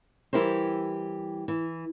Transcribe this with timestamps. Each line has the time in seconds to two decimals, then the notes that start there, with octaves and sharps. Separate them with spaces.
0.33 E3 G3 E4 G4 A#4 C5
1.48 E3